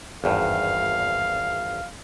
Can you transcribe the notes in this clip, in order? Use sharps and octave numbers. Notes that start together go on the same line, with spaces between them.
G#1 E2 G2 F5